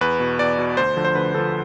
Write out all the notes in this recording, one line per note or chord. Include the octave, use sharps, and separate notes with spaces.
E2 B4
B2
E2 D5
B2
D2 C5
D3 F3
C5
D2 B4
D3 F3 A4